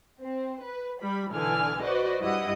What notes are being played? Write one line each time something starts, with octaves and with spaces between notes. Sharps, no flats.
C4
B4
G3 B5
B1 D3 E3 D5 G#5 F6
F#4 B4 C5 D5 D#5
G2 E4 G4 D#5 F#5 D#6